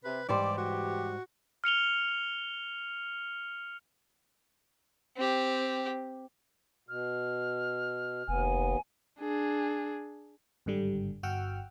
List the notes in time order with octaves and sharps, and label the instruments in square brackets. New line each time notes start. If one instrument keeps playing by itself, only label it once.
[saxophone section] C3 [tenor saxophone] B4
[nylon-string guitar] G#2 G3 C5 [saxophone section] E3 G4 [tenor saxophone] D5
[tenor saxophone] F#4
[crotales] F6 C#7 F7 G7
[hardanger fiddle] C4 G4
[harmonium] B2 [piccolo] F6
[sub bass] F1 [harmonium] D#2 B3 [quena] G#5
[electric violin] D4 G#4
[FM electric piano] G#1 G2 D3 G3
G1 F#4 F#5 G5 E6 F6